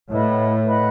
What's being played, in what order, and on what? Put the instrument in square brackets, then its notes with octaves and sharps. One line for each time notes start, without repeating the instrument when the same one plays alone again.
[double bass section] A2 [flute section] B4 D#5 F#5 B5
[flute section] B4 D#5 F#5 B5